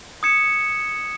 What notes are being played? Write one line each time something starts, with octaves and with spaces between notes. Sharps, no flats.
D#6 G#6 C#7 E7